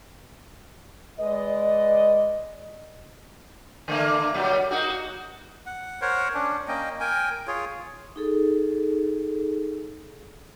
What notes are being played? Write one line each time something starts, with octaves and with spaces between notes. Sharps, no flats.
G#3 B4 D5 D#5
D3 A3 A#3
A#2 F#3 G3
A#3 D#4 F#4
F#4
F#5
A#4 C5 C#5 F#5
C#4 D4
A#3 C#4 D#5 G5
A#4 G5 G#5
F4 G#4 C#5
D#4 G#4 A4